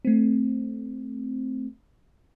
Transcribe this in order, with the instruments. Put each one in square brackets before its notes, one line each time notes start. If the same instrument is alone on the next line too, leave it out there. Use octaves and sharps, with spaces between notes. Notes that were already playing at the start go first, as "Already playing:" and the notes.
[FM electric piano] A3 C4